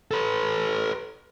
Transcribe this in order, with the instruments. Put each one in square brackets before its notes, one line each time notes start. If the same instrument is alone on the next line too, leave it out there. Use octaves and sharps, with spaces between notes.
[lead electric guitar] A4 B4